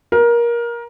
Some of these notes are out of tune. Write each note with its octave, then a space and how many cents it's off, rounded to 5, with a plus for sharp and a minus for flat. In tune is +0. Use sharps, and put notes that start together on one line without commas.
A#4 +20